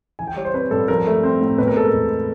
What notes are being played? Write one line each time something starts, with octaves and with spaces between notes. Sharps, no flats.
E3 G#5
G5
G3 C#5
C5
C4 B4
G2 A4
F3 A#4
A3
C4
A2
B2 B4
A#4
G#3 A4
A#4
E2